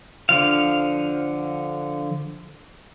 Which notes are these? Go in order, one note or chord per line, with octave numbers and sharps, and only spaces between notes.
D3 F3 F5